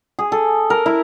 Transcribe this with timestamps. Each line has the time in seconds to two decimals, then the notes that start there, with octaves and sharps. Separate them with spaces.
0.19 G#4
0.32 A4
0.70 A#4
0.86 E4